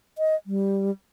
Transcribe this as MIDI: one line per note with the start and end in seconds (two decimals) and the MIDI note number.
0.18 0.35 75
0.46 0.91 55